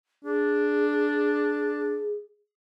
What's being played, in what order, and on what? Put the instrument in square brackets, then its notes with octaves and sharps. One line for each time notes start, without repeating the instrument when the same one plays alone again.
[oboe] D4 [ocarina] G#4